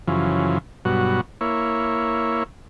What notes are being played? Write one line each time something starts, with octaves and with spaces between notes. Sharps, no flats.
F#2 C#3 E3 F3
G2 B2 F#3 F#4
A#3 E4 C#5